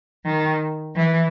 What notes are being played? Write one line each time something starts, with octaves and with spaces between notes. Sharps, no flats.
D#3
E3